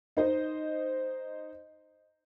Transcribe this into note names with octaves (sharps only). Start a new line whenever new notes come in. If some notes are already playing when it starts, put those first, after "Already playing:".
D#4 C5 D#5